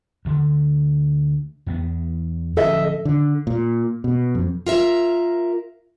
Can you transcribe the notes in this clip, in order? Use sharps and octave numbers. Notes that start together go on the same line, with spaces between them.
D2 D3
E2 B3
D1 F3 C#4 A4 D#5 E5
D3
A#2
B2
F2
F4 A#4 E5